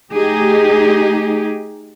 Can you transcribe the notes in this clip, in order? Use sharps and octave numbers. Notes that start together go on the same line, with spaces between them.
A3 D#4 G4 G#4